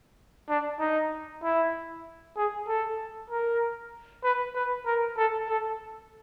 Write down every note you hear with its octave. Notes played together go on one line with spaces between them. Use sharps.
D4
D#4
E4
G#4
A4
A#4
B4
B4
A#4
A4
A4